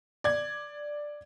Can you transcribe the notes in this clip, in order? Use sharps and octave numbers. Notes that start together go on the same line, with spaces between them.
D5 G#6